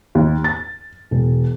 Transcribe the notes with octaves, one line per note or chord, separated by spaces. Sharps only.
D#2
A6
E1